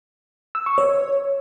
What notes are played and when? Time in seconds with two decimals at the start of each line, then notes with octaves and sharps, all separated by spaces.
0.55 E6
0.66 C#6
0.78 C#5